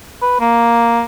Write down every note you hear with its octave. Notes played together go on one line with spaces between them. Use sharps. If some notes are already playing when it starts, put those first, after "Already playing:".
B4
A#3